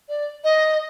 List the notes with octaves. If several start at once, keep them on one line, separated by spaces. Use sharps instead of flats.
D5
D#5